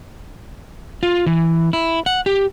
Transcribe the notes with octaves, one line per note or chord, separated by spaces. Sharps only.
F4
E3
E4
F#5
G4